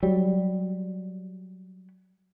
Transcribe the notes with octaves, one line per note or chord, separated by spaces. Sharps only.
F#3 G3